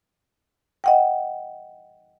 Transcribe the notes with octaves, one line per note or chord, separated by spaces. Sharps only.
D#5 F#5 G5